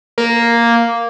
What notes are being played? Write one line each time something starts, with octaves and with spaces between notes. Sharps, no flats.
A#3